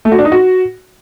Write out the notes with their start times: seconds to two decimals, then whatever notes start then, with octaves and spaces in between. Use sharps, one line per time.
0.05 A3
0.12 F#4
0.18 D4
0.25 D#4
0.32 F#4